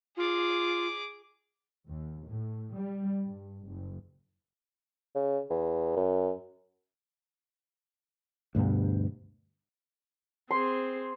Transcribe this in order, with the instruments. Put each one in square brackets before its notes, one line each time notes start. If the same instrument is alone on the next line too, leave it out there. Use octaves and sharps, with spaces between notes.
[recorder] F4 [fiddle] G#4 D6
[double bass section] D#2
A2
G3
G2
F#1
[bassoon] C#3
E2
F#2
[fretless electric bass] D2 G2 B2 B3
[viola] C4 G#4 [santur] C6